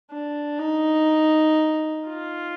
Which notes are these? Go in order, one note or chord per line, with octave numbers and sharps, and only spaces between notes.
D4
D#4
F4